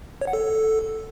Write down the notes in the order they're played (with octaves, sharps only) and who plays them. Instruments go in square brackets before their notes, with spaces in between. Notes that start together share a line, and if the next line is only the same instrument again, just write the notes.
[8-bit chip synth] C#5
F#5
A4